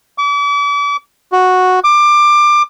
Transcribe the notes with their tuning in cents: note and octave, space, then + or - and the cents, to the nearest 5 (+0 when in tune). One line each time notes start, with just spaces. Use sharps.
D6 -40
F#4 -5
D6 +20